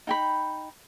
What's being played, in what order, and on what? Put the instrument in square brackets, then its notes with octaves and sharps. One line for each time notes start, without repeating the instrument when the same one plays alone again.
[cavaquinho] D#4 G5 B5